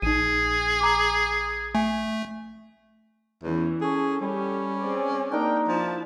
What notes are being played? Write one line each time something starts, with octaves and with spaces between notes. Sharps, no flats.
A#1 D#4 G#4 D#7
A#5 D6
A3 G#5
E2 E3 C#4
C#4 G#4 A4
G3 C#4 G4 A4
C4 G#4 D5
A#3 D4 D#4 A#4 G5
F3 E4 A5